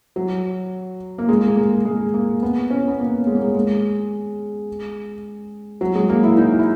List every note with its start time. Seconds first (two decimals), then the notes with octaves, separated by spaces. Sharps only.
0.16 F#3
1.18 A#3
1.29 G#3
1.48 A#3
1.57 G#3
1.85 G#3
2.14 A#3
2.42 B3
2.70 C#4
2.88 B3
2.99 A#3
3.27 G#3
3.35 A#3
3.42 G#3
3.55 G#3
5.81 F#3
5.95 G#3
6.09 A#3
6.23 E4
6.37 D#4
6.59 E4